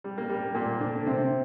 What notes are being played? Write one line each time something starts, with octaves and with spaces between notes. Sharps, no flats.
G3
A#3
G3
A#2 A#3
D3 D4
C3 C4